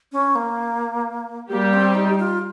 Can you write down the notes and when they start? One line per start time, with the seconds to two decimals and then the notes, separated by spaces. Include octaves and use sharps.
0.12 C#4
0.35 A#3
1.50 G3 A#3 G4
1.73 C4
1.95 D#4
2.19 F4